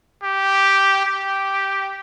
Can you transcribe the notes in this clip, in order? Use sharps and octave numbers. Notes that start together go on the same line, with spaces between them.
G4
G4